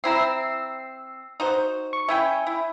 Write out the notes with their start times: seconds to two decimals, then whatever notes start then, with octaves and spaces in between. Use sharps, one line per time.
0.04 C4 E4 A#5 E6 C7
1.40 D#4 F#4 C5
1.93 C#6
2.09 C#4 E4 E5 G5 G#5
2.47 E4